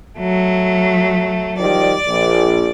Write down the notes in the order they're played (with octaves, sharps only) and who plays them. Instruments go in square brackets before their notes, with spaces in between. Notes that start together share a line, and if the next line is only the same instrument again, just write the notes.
[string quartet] F#3 A3
[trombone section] D#3 F3 G3 [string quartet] D5
[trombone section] A#1